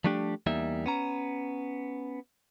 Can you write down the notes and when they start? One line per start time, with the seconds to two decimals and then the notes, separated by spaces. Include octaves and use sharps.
0.04 F3 G3 A3 D4 G4
0.46 E2 G3 A#3 D#4 E5
0.86 B3 C#4 A#5